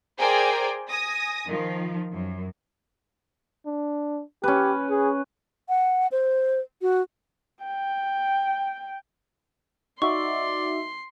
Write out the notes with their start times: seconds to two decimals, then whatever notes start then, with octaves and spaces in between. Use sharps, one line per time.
0.19 G#4 A#4 C5 D5 G5 G#5
0.90 G#5 D#6 A#6
1.46 D#3 F3
2.13 F#2
3.66 D4
4.43 C#4 G4 B4
4.90 G#4
5.69 F#5
6.12 C5
6.82 F#4
7.64 G5
10.02 D#4 F#4 D5 E5 C6 C#6